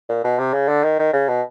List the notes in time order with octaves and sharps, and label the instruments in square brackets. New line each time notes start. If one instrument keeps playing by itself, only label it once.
[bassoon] A#2
B2
C3
C#3
D3
D#3
D#3
C#3
B2